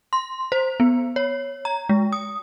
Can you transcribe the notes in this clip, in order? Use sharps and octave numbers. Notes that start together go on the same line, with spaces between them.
C6
C5
B3
C#5
A#5
G#3
D#6